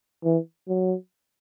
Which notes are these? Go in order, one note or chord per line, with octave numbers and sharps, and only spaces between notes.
E3
F#3